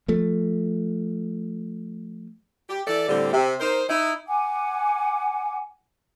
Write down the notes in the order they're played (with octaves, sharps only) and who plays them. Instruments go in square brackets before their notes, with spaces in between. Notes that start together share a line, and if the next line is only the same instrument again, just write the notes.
[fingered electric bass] F3 A3
[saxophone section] G4
E3 A4 D5
A2 D3 G3 C4 G4
C3
D#4 A#4 C5
D#4 E4
[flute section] F#5 G#5 D6